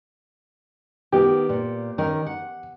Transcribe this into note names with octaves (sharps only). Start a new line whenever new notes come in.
D#3 B3 G4
A#2
D#3 C#4 A#4
F#5